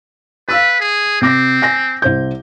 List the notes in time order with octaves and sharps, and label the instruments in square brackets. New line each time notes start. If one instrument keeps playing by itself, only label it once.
[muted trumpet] B4 [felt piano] F5 E6 A6
[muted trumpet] G#4
[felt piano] C3 D6 A#6 [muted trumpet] C4
[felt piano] G#5 A#6
C2 C5 G6